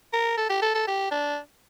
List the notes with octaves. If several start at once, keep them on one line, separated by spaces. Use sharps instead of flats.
A#4
A4
G4
A4
A4
G4
D4